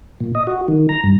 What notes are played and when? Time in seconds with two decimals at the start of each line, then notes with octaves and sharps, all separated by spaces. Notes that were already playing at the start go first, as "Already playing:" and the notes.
0.20 A#2
0.35 D#5
0.47 F#4
0.68 D#3
0.89 A#5
1.04 G2